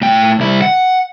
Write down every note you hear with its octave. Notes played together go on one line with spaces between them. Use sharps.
A2 G5
C2 E4
F#5